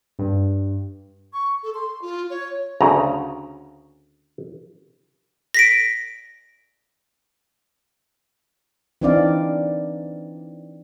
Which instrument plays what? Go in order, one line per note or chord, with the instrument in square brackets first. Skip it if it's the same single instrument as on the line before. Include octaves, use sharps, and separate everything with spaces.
[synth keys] G2
[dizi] C#6
A4
C6
F4
C#5
[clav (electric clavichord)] D2 C#3 A#5
[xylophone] A#6 B6 D7
[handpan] E3 C4 D4 D#4 D5 F5